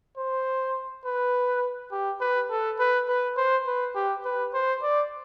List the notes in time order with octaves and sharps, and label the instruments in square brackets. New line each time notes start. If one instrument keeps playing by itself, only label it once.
[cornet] C5
B4
G4
B4
A4
B4
B4
C5
B4
G4
B4
C5
D5